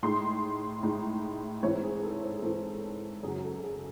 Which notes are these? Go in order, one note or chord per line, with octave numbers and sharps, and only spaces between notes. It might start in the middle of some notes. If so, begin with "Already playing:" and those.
A2 G#3 D#4 C6
A2 G#3 D#4
G#2 E3 C4 C#5
G#4
G#4
A4
C5
G#4
G#2 E3 C4 A4
F#2 C#3 F#3 G#4
A4
A4
G#4